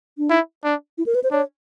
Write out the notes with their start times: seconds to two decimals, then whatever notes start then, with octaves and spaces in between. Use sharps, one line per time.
0.18 D4
0.30 D#4 E4
0.64 D4
0.98 E4
1.06 A#4
1.15 B4
1.24 C5
1.32 D4 C#5